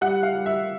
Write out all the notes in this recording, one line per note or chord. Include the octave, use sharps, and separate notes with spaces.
G3 F#5
F5
G3
E5